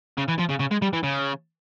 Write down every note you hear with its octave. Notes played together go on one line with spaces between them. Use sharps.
C#3
E3
F3
C#3
C#3
G#3
G3
E3
C#3